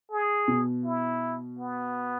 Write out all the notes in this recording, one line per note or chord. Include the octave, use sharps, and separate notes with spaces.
G#4
B2
E4
B3